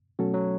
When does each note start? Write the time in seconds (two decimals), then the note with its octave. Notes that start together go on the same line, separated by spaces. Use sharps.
0.19 B2 F#3 A3 C#4 F#4 A4
0.34 F#3